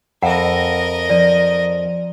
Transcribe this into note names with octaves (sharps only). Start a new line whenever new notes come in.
F2 A#4 D#5 E5 F#5 B5
F3 D5 D#7